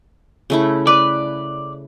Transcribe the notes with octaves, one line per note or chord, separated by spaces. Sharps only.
C#3 A3 E4
B4 D5